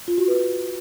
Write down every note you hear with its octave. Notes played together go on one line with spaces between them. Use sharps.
F4
F#4
B4